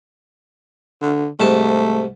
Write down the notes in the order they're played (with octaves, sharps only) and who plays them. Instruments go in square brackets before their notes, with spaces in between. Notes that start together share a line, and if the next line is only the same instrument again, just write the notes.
[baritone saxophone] D3
[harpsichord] C2 G#2 A5 [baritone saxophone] A3